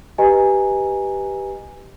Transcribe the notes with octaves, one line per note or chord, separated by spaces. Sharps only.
G4 B4 D#5 G#5 A#5